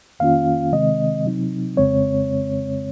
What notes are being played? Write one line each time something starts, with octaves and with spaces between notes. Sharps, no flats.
F2 D#3 A#3 C#4 F4 F5
C3 D#3 G#3 C4 D#5
C3 F#3 C4 D#4
F2 C#3 G#3 C4 C#5